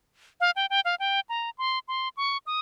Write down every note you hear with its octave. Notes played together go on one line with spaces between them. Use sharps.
F5
G5
G5
F5
G5
A#5
C6
C6
C#6
D#6